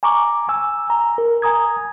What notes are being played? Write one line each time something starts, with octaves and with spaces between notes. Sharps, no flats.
G#5 A#5 C#6 D6
G#5 E6
A#5
A#4
G#5 A#5 D#6 G#6